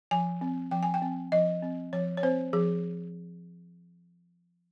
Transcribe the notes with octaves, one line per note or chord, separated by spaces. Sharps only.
F3 G#5
C4
F3 G5
G#5
G5
C4
F3 D#5
C4
F3 C#5
C#5
C4 C5
F3 G#4